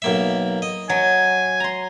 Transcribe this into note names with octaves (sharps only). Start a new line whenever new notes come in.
B1 A#3 E5
D#5
F#3 G#5
A#5 C6